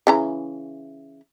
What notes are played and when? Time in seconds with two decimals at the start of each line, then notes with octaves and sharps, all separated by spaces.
0.07 C#3 E3 A#5